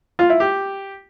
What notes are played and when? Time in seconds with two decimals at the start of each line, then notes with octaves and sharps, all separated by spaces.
0.19 F4
0.30 E4
0.40 G4